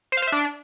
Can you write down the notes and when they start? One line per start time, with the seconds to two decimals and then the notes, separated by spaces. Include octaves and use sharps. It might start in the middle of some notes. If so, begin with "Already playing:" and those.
0.12 C5
0.17 F5
0.22 C5
0.27 E5
0.32 D4